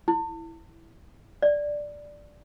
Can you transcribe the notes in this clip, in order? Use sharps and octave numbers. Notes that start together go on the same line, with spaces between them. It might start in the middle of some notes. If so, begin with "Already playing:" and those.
E4
D5